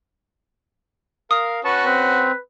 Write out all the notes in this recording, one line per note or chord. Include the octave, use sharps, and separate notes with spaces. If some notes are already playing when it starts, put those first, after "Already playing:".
A#4 F5 D#6
C#4 F#4 B4 A5 C#6
C4 B4